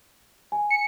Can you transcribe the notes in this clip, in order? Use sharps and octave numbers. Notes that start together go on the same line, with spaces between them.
G#5
C#7